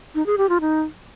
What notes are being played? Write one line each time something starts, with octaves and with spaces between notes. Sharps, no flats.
D#4
G#4
G4
F4
D#4